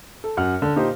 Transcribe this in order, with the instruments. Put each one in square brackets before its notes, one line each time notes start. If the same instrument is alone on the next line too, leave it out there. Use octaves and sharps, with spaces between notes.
[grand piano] A4
F#2 F#5 F6
D3
A#2 D#4 G4 C5